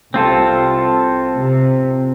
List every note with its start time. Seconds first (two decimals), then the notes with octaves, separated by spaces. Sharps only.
0.14 C2 C4 F4 A4
1.36 C3